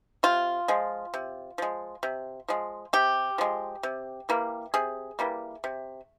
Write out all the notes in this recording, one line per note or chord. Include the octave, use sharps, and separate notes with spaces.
C3 F4
F3 G#3
C3
F3 G#3
C3
F3 G#3
C3 G4
F3 G#3
C3
E3 G3 A#3
C3 G#4
E3 G3 A#3
C3